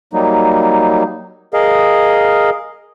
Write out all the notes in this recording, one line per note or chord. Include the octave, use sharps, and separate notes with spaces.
F#3 G3 A#3 D#4
G#4 A#4 D#5 F5